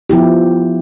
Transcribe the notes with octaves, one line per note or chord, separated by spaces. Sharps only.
F3 B3 E4 G4